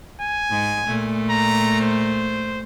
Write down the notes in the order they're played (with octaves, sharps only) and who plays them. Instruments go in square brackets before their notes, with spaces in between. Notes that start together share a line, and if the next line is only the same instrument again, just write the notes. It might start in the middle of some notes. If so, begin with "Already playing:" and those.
[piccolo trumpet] G#5
[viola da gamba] G#2
A#2 A3
[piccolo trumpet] A#5
C5